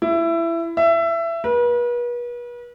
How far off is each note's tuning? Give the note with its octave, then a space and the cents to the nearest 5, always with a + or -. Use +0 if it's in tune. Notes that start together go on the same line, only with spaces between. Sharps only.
E4 +20
E5 +20
B4 -40